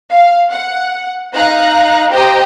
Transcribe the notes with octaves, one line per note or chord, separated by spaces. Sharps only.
F5
F#5
D#4 F5 A#5 F#6
G4 C5 D#5 G5 A#5